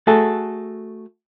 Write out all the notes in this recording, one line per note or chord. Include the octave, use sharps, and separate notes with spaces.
A3 F#4 G#4 A4